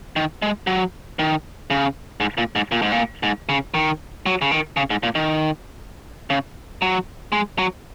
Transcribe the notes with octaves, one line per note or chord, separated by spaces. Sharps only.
D#3
G#3
F#3
D#3
C#3
G#2
A#2
G#2
A#2
G#2
A#2
G#2
C#3
D#3
F#3
C#3
D#3
C#3
G#2
A#2
D#3
C#3
F#3
G#3
F#3